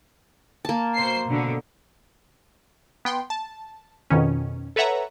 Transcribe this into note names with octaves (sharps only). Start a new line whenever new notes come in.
A#3 A5
B2 C5 C7
B2 D3
B3 G5 C6
A5
F2 B2 D#3 C#4
A4 B4 C#5 E5 F#5 A#5